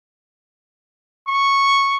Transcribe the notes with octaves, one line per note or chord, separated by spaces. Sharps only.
C#6